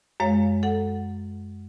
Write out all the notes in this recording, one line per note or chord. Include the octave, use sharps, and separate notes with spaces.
F#2 G#3 C#5 F5
A4 F#5